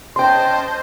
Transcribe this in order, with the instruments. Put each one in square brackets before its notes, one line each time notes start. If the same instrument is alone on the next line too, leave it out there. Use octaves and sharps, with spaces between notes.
[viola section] C#4 D#5 A5 [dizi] C5 [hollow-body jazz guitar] G5 C6